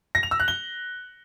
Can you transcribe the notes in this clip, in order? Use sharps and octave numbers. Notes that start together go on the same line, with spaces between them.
A#6
F7
E6
F#6
G7